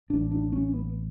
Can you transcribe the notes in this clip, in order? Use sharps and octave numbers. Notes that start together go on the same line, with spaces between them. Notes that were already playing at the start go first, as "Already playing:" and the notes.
A1 G#2 D4
D4
C#4
B3